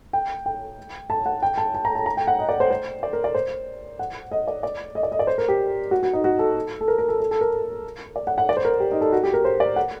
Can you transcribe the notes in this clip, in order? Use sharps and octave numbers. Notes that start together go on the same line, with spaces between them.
G5
G5
A5
F#5
G5
A5
A5
A#5
A5
A#5
G5
F#5
D#5
D5
C5
C5
D5
A#4
D5
C5
F#5
D#5
D5
D5
D#5
D5
D#5
D5
C5
A#4
G4
F#4
F#4
D#4
F#4
A4
A4
A#4
A#4
A4
A4
A4
A#4
D5
F#5
F#5
D5
C5
A#4
G4
D#4
A4
F#4
G4
A#4
C5
D5
F#5